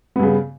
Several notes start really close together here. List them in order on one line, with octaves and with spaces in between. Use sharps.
B3 G2 C#3